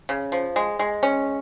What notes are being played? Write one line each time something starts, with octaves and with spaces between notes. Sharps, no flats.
C#3
F3
G#3
G#3
C#4